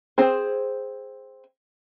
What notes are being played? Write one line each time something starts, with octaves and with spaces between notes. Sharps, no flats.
C4 G#4 C5